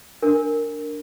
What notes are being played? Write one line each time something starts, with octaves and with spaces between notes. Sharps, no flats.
D4 A#4